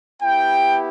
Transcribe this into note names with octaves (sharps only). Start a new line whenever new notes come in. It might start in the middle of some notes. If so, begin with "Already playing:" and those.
B3 E4 G4 G5